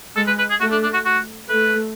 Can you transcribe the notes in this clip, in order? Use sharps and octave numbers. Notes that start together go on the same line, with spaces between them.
G#3 A4
B4
B4
G#4
A3 F#4
D4
D4
F#4
F#4
A3 B4